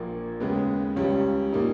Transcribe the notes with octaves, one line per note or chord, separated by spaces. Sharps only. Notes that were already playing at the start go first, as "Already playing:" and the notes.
Already playing: A#1 A#2 A#3
D#2 C#3 G#3 B3
C#2 C#3 G3 C#4
A#2 G3 A#3 D#4